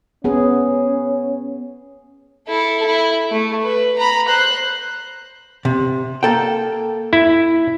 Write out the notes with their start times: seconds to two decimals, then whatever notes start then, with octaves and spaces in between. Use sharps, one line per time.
0.24 B3 C#4 G#4
2.48 E4 A4
2.86 E4
3.31 A3
3.62 B4
3.98 A#5 B5
4.28 C5 F#6
5.65 C3
6.23 A#3 A4 G5
7.13 E4